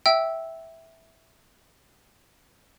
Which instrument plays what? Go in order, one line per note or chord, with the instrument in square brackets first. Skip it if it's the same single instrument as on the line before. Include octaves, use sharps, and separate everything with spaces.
[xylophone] E5 G5 E6